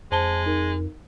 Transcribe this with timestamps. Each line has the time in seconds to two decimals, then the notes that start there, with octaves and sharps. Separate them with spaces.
0.11 F2 G#3 C5 A5 G7
0.46 D#4 A#4